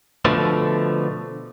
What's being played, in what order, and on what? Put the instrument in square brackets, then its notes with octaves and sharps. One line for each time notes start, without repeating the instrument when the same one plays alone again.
[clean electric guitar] B2 D3 F3 A3